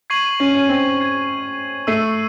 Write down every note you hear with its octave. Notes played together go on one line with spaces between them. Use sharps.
C#6 G#6 C7 D#7 F#7
C#4
C#4
C4
G#6 C7 F#7
A3 E6 C7 D#7